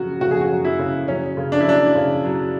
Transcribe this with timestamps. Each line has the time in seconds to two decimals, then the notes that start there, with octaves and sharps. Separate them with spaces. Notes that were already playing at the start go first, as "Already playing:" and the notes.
Already playing: C#3 F#3 F#4
0.21 C#3 F#4
0.31 G#4
0.41 F#4
0.50 F#3
0.65 E4
0.79 C#3
1.08 F#3 C#4
1.37 C#3
1.52 D4
1.61 E4
1.66 F#3 D4
1.96 C#3
2.25 F#3